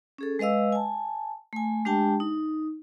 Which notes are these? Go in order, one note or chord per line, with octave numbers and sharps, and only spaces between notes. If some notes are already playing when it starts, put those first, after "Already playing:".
C#4 G#4 A4
G#3 B4 D#5 F5 E6
G#5 A5
A3 G#5
G#3 D4 G4 G5 A5
D#4